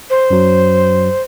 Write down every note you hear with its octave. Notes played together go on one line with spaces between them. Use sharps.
C5
F#2 F#3